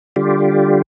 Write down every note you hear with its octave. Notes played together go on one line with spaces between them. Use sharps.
D3 G3 F4 G4